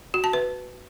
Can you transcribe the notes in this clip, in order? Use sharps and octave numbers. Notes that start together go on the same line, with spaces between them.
F#4
A5
B4